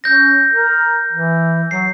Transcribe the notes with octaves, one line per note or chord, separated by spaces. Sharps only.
C#4 G6 A#6
A#4
E3
F#3 C7